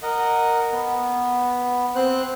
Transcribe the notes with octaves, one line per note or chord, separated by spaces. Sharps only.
A#4 D#5 F#5
B3
C4 C5 F#6